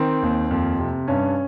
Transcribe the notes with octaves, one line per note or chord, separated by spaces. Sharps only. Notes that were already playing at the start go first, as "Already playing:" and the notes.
Already playing: D#3 C4
D#2
F2
C3
G2 C#4